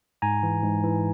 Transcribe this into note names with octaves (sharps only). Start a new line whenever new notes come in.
G#2 G#5 A#5
E3
G#2
E3